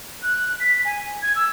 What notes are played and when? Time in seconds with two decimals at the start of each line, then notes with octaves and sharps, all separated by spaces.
0.22 F#6
0.60 B6
0.85 G#5
1.23 G#6
1.36 E6